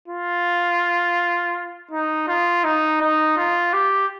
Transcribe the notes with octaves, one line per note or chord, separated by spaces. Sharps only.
F4
D#4
F4
D#4
D#4
F4
G4